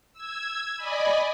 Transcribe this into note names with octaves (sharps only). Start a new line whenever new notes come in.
E6 G#6
D5 D#5 G#5 B5